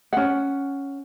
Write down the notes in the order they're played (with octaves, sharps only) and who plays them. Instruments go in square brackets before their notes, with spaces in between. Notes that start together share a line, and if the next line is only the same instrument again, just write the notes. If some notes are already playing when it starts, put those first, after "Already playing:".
[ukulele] C#4 F#5